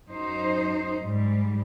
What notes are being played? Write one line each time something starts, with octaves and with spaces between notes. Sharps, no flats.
F#2 D#4 C5
G#2 G3